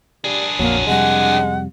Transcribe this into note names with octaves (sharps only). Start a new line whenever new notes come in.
G3 D4 G#4
A#1 F2 F#3 A#3
F2 C3 G3 G#3 F#5